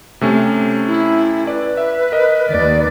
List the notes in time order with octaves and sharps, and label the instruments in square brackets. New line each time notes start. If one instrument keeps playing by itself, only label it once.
[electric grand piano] C3 A3 C#4
[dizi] E4
[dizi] B4 [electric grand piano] D5
[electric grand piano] E5
A#4 D#5
[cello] D#2 D5